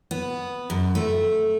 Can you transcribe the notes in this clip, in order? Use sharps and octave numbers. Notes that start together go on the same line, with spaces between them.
B3
F#2
A3